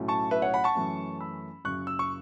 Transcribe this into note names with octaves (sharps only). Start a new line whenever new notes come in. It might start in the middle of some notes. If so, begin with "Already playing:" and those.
Already playing: B1 A2 F#3 A3 C#4
A5 C#6
B4 E5
C#5 F#5
F#5 B5
A5 C#6
F#2 E3 A3 C#4
B5 E6
F#1 F#2 C#3 C#6 F#6
E6
C#6